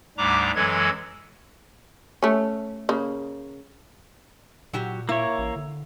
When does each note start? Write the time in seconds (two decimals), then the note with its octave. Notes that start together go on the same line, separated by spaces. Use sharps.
0.18 D2 G#2 G3 D4 A#5 D6
0.55 F#2 E3 F#3 G#3 A4 G#6
2.23 A3 C#4
2.89 C#3 A#3
4.73 A#2 F#3 F#4 G4
5.09 A#3 E4 C#5
5.38 A1
5.56 D3